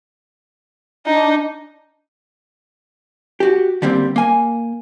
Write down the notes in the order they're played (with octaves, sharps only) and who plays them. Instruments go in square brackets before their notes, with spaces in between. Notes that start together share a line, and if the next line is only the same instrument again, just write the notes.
[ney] D4 [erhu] D#4
[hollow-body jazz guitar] F#4 G4
D3 G3 A#3 C4
A#3 G#5